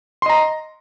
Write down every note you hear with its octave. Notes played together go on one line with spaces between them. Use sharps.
D#5 A#5 C6